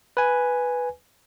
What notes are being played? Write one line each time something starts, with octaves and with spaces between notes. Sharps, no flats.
B4 G#5